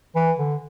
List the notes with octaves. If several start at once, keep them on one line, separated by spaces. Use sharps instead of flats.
E3
D3